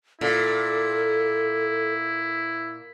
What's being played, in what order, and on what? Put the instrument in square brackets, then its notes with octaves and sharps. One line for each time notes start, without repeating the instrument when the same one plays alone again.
[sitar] A#2 [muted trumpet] E4 [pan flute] A4